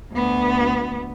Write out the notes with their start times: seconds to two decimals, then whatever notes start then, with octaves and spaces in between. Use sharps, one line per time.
0.12 D2 B3